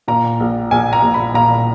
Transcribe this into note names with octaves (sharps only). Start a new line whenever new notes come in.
A#2 A#5
A#1
A#1 G#5
A#5
A#1
B5
A#2 A#5